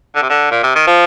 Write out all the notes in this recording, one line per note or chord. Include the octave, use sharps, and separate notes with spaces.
D3
C3
D3
A#2
C3
D#3
F3